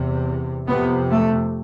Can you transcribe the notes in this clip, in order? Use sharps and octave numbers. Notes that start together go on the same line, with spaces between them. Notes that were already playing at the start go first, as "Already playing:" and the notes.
Already playing: E2 C3
F2 C3 B3
A3